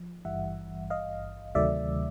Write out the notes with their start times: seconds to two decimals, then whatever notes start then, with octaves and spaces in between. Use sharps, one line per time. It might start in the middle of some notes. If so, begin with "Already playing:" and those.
Already playing: F3
0.25 G#1 G2 E3 G3 E5 F#5
0.90 D#5 F5
1.55 D2 C3 D#3 F#3 A3 D5 E5